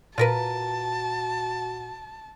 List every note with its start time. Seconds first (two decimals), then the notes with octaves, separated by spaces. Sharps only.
0.18 A#2 F4 F#4 A#4 B4 A5